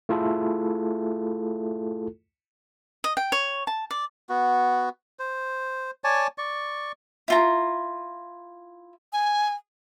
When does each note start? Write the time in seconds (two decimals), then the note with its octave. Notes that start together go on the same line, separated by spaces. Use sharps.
0.09 A3 E4 F4 G#4 A4
3.04 D#5
3.17 G5
3.32 C#5
3.67 A5
3.91 D5
4.29 B3 F#4
5.19 C5
6.04 C#5 D5 G#5 A5
6.38 D5 C#6
7.28 E4 F4 A#5
9.13 G#5